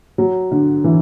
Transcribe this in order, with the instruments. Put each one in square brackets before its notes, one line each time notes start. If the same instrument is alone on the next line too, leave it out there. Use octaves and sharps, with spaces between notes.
[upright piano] F#3
D3
E3